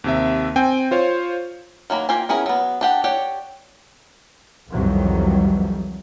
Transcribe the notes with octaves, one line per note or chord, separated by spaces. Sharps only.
D#2 C3 E5
C4 G5 G#5
F4 C5 C#5 F5
D#3 F#3 A#3 B5
A#3 F4 G4 G#5
B3 C#4 E4 G#4 A#4
F#3 B3
D4 G4 F#5
G4 C#5 D5 F#5
C2 F2 D#3 E3 F#3 G3